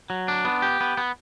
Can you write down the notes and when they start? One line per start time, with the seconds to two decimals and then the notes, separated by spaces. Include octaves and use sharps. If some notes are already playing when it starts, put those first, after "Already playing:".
0.10 F#3
0.28 D4
0.45 B3
0.62 G4
0.81 B3
0.97 B3